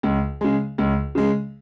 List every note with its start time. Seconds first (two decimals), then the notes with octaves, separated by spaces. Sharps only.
0.03 C#2
0.41 C#3 G#3
0.78 C#2
1.15 C#3 G#3